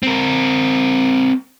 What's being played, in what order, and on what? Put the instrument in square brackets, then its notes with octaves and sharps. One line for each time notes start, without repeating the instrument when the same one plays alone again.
[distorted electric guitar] C4 A#4